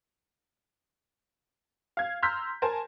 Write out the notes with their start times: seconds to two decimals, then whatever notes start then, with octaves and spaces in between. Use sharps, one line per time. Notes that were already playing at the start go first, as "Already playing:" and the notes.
1.97 F5 G#6
2.23 A#5 C6 E6 F6 G6 B6
2.62 A#4 C5 G#5 A5